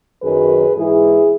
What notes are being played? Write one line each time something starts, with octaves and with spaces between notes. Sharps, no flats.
F#2 D#3 F#3 G#4 B4
G#2 E3 E4 G#4